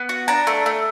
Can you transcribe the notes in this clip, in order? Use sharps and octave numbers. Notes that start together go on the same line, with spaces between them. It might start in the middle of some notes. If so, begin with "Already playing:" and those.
Already playing: B3
F#4
D4 A#5
A3
A3